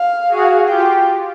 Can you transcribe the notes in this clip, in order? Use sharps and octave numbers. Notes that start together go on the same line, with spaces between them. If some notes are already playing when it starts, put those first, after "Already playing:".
Already playing: F5
F#4 G#4
F4 G4 G5